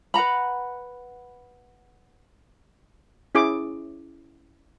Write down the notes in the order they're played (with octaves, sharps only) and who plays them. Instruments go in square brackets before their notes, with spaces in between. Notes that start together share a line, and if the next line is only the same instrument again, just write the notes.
[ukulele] B4 F#5 A#5 B5
[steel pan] C#4 E4 G#4 D6